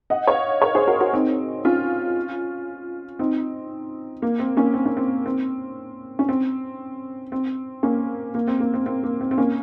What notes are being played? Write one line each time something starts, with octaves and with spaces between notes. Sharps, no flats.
D#5 F#5
C#5 F5
A#4 C#5
G#4 C5
F#4 A#4
F#4 A#4
C4 D#4
C#4 F4
C4 D#4
A#3
C4
A#3 C#4
C4
C#4
C4
C4
C#4
C4
C4
A#3 C#4
A#3
C4
A#3
C4
C4
A#3
C4
C4
A#3 C#4